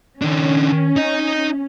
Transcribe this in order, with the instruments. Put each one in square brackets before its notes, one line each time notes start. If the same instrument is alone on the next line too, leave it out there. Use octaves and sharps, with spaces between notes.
[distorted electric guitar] D#3 D4 [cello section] C#4
[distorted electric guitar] D#4 D#5